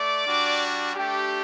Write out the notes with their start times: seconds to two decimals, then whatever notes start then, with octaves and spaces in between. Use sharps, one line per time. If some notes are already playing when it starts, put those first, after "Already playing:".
Already playing: A3 D5 D6
0.25 G3 D4 F#4
0.95 A3 D4 G4